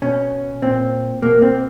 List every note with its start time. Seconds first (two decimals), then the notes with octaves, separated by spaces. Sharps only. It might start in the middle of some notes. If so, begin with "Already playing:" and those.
0.02 B2 C#4
0.62 A#2 C4
1.22 B2 A#3
1.42 C4